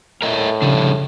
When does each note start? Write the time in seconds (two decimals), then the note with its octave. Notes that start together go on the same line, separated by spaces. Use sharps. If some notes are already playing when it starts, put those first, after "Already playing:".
0.22 A2 A#4 D#5 E5
0.62 C#3 F3 G3 D4